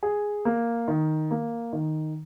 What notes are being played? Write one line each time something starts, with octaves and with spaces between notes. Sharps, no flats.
G#4
A#3
D#3
A#3
D#3